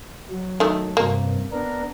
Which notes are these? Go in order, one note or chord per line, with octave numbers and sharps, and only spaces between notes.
F#3
D#3 A3
G2 C3 A#3
B3 D4 A#4